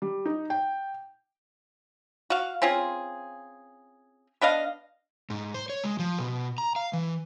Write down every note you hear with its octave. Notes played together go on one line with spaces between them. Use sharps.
G3
D#4
G5
F#4 F5
C4 C#4 F4 G#4
B3 D4 D#5 F5
G#2
C5
C#5
G#3
F3
B2
A#5
F5
E3